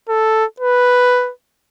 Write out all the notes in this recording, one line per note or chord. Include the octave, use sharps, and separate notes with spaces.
A4
B4